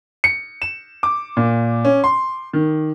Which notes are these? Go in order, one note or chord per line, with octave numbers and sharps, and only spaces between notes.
C#7
E7
D6
A#2
C#4
C6
D#3